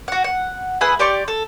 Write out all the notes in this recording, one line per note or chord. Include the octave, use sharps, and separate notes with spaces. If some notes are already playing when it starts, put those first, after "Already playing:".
F#4 F#5
F#5
E4 G#4 B4 F#5
G4 D5 C6 C#6
A4